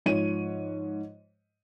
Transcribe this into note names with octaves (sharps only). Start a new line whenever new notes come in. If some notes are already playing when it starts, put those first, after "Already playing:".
G#2 F3 C#5 D#7